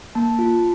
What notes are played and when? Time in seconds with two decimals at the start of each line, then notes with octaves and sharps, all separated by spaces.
0.15 A#3 A5
0.39 F4